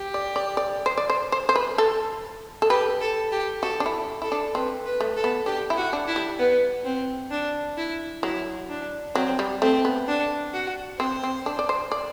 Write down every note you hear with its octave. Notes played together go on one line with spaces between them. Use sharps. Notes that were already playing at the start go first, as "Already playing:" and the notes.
Already playing: G4
D5
D5
D5
C5
D5
C5
C5
C5
B4
A4
A4
G4 B4
A4
G4
F#4 A4
D4
E4
E4 A4
D4
C4 B4
B4
A3
A4
B3
D4 G4
E4
F#4
D4
E4
G3
B3
C4
D4
E4
F#3 E4
D4
F#3 C4
G3
A3 C4
B3
D4
F#4
C4 C5
C4
D4
D5
C5
D5